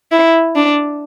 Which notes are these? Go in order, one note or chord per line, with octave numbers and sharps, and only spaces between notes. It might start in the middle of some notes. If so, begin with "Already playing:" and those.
E4
D4